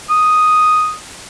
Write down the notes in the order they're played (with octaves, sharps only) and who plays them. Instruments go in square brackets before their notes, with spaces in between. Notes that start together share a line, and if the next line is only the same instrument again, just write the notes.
[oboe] D#6